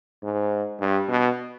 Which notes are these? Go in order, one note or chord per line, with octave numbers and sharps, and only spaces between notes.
G#2
G2
B2